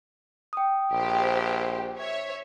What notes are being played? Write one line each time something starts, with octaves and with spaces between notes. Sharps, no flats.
G5 D#6
A#1 G4 C5
C#5 E5